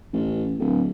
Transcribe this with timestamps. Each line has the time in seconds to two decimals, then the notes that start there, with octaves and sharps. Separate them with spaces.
0.13 A1
0.59 D1